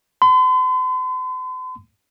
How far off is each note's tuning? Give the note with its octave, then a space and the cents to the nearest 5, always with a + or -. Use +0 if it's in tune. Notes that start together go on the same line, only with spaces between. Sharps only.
C6 -45